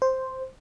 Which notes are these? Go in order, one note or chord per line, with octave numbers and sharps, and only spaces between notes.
C5